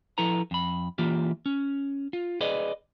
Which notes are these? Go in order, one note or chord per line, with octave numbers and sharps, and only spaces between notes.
F3 E4 A4 B4 A#5
F2 B5
E3 A#3 F4 G4
C#4
F4
G#4 B4 D5 D#5